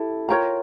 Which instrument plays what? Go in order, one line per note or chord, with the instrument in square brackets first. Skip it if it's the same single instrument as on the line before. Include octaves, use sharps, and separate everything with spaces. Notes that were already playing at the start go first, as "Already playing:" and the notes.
Already playing: [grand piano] E4 G4 A4
[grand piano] F4 [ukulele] A#4 C#5 G5 A#5